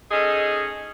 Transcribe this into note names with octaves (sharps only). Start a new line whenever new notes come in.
C#4 D#4 G#4 A4 D#5